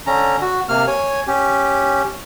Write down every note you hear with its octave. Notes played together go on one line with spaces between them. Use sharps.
D3 C#4 A#5
F#4
C3 A#3 F6
C#5 G#5
C#4 G4